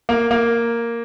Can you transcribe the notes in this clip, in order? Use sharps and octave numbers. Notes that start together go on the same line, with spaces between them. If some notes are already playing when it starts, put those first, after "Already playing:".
A#3
A#3